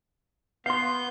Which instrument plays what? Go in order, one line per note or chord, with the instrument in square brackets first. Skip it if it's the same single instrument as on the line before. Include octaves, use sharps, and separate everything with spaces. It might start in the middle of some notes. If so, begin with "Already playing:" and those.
[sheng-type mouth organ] B3 G6 [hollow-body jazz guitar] F5 C6